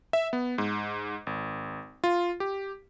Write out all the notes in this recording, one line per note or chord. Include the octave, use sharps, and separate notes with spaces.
E5
B3
G#2
G#1
F4
G4